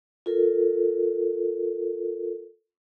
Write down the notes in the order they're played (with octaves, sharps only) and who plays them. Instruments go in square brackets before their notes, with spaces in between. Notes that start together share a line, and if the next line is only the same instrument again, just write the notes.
[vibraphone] F4 A4 A#4